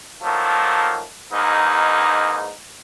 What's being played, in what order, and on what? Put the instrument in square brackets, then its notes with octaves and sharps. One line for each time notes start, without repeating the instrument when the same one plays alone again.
[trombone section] D#3 F3 F#3 A3 A#3
E2 G#2 A#3 D#4